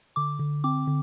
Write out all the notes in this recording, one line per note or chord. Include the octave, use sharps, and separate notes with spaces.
D3 D6
D3
C4 D6
D3